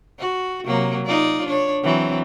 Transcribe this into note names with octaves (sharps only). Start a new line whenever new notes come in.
F#4
C3 F#3 A#3
D#4 F4 D5
D4 C#5
E3 F#3 C4